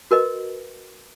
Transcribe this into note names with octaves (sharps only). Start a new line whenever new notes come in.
F#4 A#4 B4 D#5